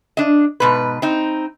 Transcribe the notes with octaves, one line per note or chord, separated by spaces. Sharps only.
D4 D#5
G#2 B2 B4
C4 D#4